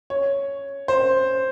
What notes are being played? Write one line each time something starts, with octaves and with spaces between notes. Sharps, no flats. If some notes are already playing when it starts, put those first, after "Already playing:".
C#5
C5